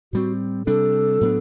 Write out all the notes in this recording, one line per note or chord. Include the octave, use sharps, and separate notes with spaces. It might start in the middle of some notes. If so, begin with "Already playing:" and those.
A2 G3 C4 F#4
C3 G3 D4 A4
A2 F#3 B3 D4